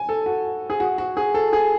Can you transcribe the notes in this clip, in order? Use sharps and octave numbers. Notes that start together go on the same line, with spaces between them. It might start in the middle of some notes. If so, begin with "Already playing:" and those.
Already playing: G#5
A4
F#4
G#4
F#4
F#4
G#4
A4
G#4